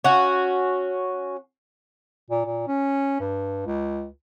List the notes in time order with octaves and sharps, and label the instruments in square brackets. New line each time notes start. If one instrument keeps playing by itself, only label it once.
[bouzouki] C#4 F#4
[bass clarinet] A#2
A#2
C#4
G2
C#2